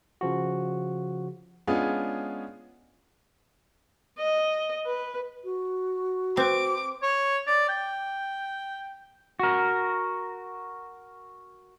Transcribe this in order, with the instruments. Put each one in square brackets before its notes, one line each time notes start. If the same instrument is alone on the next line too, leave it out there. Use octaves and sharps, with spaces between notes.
[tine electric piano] C#3 F3 F#4
[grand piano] G#3 B3 C#4 D4 F4 G#4
[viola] D#5
B4
[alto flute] F#4
[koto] C4 [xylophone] B4 C5 [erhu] D6
[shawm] C#5
D5
G5
[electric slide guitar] F#4 A#4